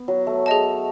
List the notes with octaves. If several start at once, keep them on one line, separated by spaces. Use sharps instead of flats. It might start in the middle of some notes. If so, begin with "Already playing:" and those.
Already playing: B3
F#3
A3
G#4 D#5 A5